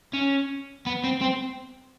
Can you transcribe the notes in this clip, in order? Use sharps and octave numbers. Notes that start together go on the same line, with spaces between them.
C#4
B3
C4
C4